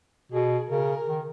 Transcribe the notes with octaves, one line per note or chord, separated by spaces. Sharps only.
B2 G#4
C#3 A#4
D#3